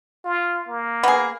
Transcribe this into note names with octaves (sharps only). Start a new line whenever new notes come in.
F4
A#3
B3 G#4